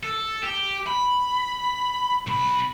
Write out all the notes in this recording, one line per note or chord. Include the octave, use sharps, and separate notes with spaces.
A4
G4
B5
B1 B5